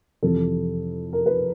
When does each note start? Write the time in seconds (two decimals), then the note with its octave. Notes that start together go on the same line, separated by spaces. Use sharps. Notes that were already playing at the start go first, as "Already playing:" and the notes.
0.23 F2 C3 E3 A4
1.13 A#4
1.26 B4